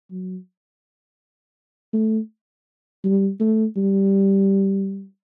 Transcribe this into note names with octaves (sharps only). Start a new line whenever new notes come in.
F#3
A3
G3
A3
G3